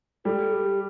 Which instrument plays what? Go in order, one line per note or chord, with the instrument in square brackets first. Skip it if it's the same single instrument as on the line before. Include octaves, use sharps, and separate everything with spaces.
[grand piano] G3 [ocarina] A4
[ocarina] G4